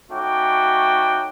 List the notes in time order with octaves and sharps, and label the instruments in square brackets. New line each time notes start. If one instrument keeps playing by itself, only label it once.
[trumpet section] A3 C#4 D#4 F#4 G5 D6